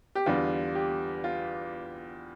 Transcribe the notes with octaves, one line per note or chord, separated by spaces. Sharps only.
G4
E2 D3 G3 F4
G4
F4